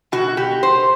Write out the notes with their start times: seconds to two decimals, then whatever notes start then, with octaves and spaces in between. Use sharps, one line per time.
0.12 B2 F#4
0.37 G4
0.63 C5